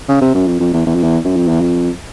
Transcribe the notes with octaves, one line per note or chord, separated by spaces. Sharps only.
C#3
C3
F#2
F2
F2
E2
E2
F2
E2
F#2
F2
E2
F2